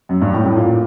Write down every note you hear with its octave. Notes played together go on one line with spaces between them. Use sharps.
F#2
G2
A2
A2
A#2